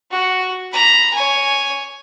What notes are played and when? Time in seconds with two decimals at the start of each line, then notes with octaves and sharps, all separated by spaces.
0.11 F#4
0.72 A#5 B5
1.14 C#5 G#5